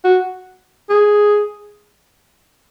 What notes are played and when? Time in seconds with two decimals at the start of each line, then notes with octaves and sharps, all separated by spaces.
0.04 F#4
0.90 G#4